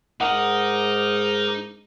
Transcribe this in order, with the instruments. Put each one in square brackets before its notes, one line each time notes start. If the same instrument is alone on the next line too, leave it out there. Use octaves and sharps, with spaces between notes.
[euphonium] G#2 [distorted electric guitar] D#4 D#5 [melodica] A#4 D6 D#6 [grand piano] F#5